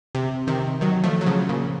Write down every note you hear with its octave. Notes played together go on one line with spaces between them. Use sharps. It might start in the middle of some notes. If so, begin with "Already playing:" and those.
C3
C3 D#3
D#3 F#3
F3 A3
F#3
C#3 F3
A#2 C#3